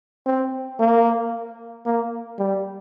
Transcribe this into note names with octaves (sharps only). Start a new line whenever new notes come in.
C4
A#3
A#3
G3